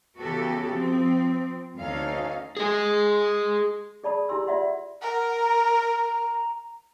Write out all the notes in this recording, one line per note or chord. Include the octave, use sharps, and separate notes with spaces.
C#3 E3 B3 F#4 G4 A4
F3 C4
D2 C#4 D#4 A4 F5
G#4 D#5
G#4 D5 A5 B5 D#6
E4 G4 G#5 C6 E6
F4 D5 E5 F#5 C6
A#4 F#5
A#5